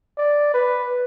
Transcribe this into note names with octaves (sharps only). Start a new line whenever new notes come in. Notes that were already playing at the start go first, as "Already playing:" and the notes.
D5
B4